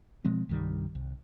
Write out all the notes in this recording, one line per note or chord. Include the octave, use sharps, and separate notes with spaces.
B2 F3 G#3 C4
C2 G2 D#3 G3
C2